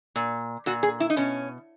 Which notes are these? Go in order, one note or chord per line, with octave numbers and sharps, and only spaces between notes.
A#2
A#2 F#4
G#4
E4
D#4
B2 C#4